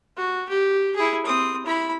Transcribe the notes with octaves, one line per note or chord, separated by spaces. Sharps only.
F#4
G4
E4 G#4
C4 D#6
E4 B5